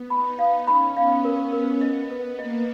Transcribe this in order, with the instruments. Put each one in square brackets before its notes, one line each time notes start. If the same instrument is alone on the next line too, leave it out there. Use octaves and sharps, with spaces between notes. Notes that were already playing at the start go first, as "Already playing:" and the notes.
Already playing: [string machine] B3
[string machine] D#4 [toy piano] B5
[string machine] D#4 [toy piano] F5
[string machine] C#4 [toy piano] B5
[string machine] B3 [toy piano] F5
[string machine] C#4 [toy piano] A#4
[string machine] B3 [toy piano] A#4
[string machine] B3 [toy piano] D#5
[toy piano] B4
[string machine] A#3 [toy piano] D#5